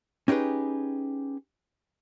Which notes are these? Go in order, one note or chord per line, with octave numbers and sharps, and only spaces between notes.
C#4 D#4 G4 G#4 B4